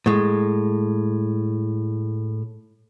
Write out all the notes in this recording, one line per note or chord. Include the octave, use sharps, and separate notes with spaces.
A2 G#3